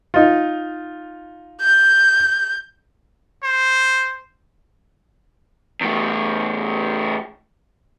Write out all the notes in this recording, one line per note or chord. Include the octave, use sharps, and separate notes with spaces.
D#4 F4
G6
C5
E2 A2